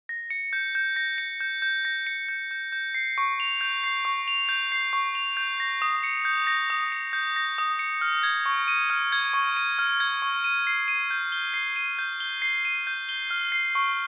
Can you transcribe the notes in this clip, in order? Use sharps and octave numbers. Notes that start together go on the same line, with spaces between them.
A#6
C#7
G6
G6
A#6
C#7
G6
G6
A#6
C#7
G6
G6
G6
C7
C#6
F7
G6
C7
C#6
F7
G6
C7
C#6
F7
G6
A#6
D#6
C#7
G6
A#6
D#6
C#7
G6
A#6
D#6
C#7
F6
G#6
C#6
D#7
F6
G#6
C#6
D#7
F6
G#6
C#6
D#7
C7
D#7
G6
G7
C7
D#7
G6
G7
C7
D#7
G6
G7
F6
C7
C#6